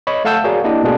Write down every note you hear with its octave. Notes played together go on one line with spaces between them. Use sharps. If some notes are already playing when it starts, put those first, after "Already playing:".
C#5 D#5 B5 C#6
A3 F5 F#5 A5 E6 G6
F#4 G#4 A#4 C#5 D5 F5
A#3 D4 E4 G4 D#5
B2 A3 A#3 D4 G#4